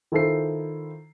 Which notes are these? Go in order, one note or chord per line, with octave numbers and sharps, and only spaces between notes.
D#3 E4 F4 A4 C5 C7